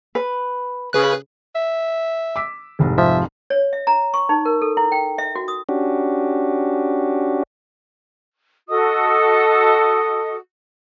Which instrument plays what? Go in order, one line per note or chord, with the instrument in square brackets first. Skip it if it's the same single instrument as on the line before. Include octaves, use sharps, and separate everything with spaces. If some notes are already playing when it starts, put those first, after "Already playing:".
[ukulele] B4
[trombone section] C#3 [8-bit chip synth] G#4 B4 F#6
[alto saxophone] E5
[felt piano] D6 E6 B6
F1 C2 G#2
[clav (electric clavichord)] F3 [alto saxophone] E5
[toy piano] C#5
E5
A#5
C#6
D#4
A#4
A4
E4
G5
E5
F#4
D#6
[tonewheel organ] C#4 D4 F#4 G4
[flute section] F#4 A4 D#5 D#6